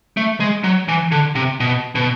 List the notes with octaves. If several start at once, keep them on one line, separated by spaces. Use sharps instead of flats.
A3
G#3
F#3
E3
D3
C3
B2
B2